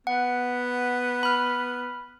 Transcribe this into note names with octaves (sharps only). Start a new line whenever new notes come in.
B3 F#5
B5 F6